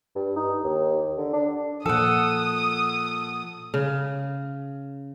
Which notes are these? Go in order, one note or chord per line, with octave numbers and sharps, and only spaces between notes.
G2
D#4
D#2
D3
D4
A#2 F3 A4 F#5 D#6
C#3